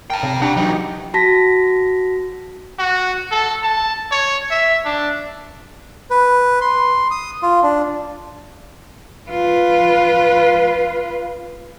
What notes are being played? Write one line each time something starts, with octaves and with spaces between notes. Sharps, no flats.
A#4 G5 A5
C3
D4 G4 F#5 A#5
E3 F#3 D#4
F#4 A5 A#6 B6
F#4
A4
A5
C#5
E5
D4
B4
C6
D#6
F4
D4
F4 B4